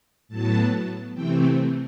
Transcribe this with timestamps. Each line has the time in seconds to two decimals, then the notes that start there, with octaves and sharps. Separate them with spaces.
0.28 A2 F#3 B3 A5
1.14 C3 E3 A3 C4 G5